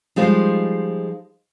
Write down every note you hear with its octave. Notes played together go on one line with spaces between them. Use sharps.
F3 G3 G#3 D#4 F4 C5